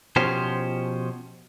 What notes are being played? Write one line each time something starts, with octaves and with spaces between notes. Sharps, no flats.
B2 F3 C#4 G4 C5